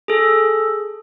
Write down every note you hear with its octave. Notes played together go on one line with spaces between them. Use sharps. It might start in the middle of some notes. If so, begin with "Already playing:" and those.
G#4 A4